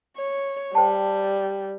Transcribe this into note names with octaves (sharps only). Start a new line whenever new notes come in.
C#5
G3 C5 G5 A5